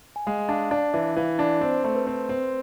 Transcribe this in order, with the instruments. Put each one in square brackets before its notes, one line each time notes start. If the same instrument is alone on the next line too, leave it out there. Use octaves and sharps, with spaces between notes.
[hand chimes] G#5
[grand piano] G#3 [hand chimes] F5
[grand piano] D4 [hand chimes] F5
[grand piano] D4 [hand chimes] D5
[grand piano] E3 [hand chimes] E5
[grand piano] E3 [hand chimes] F5
[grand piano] D4 [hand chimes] D5
[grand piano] C4 [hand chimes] C5
[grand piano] A3
[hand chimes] B4
[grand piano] C4
C4